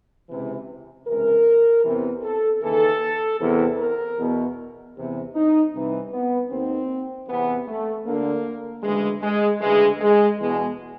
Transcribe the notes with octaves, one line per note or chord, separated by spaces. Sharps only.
C#2 C3 E3
C#2 C3 E3 A#4
E2 C3 E3
A4
D#2 C#3 E3 A4
E2 C3 E3
A#4
E2 B2
E2 C3 E3
D#4
C2 C3 E3
B3
D#2 D#3 C4
E2 C3 E3 B3
A3
D2 D3 A#3
D2 C#3 E3 G#3
G#3
D2 C#3 E3 G#3
G#3
E2 B2 G#3